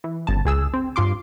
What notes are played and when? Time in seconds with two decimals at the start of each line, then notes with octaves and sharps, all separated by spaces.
0.04 E3
0.27 G1 C#3 A5
0.45 C#2 G#4 E6
0.74 C4
0.96 G2 F4 C6 D6